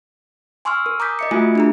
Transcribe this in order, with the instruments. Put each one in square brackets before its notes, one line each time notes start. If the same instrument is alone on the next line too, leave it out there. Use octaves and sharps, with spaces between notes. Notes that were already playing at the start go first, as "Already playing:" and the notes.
[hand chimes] G#5 C6 C#6 E6 F6
A#4
A#5 D6 D#6 G6 B6
D#5 E5 C#7
A3 F4 F#4 E5 G#5
D4 G#4 A#5